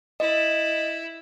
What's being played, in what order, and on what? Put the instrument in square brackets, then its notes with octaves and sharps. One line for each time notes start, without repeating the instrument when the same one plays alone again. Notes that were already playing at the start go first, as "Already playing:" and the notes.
[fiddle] E4 [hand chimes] D#5